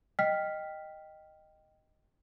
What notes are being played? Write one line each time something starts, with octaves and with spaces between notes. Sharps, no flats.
D#5 G5 F6 B6